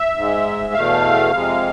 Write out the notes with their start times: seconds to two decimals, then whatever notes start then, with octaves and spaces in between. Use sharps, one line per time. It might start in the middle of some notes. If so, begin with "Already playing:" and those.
Already playing: E5
0.16 G#2 G#3
0.74 E2 B2 A3 F5
1.31 F2 C3 G#3